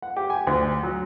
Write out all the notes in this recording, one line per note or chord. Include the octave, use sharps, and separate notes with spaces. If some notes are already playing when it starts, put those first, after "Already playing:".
F#5
G4
G#5
D2
F#3